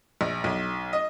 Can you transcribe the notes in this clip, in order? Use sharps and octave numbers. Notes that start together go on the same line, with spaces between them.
A#1
B1
D#5